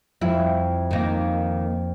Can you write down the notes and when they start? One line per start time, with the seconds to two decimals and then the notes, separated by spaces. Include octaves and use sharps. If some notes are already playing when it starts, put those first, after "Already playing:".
0.21 F2 E4
0.91 D#3 A#3